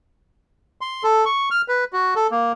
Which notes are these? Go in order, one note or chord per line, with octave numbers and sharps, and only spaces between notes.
C6
A4
C#6
F6
B4
F#4
A4
A#3